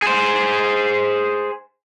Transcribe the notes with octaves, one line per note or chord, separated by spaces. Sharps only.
G#4 C5